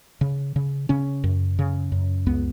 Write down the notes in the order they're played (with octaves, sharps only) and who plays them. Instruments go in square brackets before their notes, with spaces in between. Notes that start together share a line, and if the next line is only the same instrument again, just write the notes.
[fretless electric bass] C#3
C#3
C#3 C#4
F#2
C#3
F#2
C#2 B3